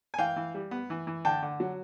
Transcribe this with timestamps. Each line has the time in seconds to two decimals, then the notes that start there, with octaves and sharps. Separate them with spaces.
0.14 G#5
0.18 E3 F5 G5
0.36 E3
0.55 G3
0.71 B3
0.90 E3
1.07 E3
1.25 D3 G5 A5
1.42 D3
1.60 F#3